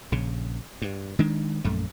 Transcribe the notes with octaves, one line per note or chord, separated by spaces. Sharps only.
A#1 C#3
G2
D#3 G#3 D4
A#1 F#2 A3